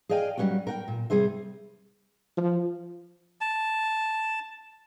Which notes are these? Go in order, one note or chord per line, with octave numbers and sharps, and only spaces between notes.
G#4 D5 D#5 F5 G5 G#5
F#3 G3 A#3 C#4 F#4
A#4 F#5 G5
A#2
C3 G3 G#4 C5 E5
F3
A5